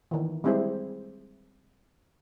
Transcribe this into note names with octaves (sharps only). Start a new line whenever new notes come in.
D#3 E3
G3 G#3 C4 E4 G#4 C5